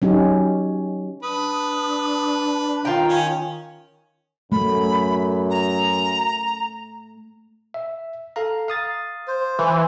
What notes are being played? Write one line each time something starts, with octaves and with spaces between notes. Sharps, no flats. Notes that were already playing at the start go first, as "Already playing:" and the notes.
F#3 C#4 D#4 G4
D4 B4 D#6
D#3 F4 G5 A#5
C#4 C#5
F#2 A3 B5
A#5
E5
A4 F5 A#5
F5 D#6 A6
C5
E3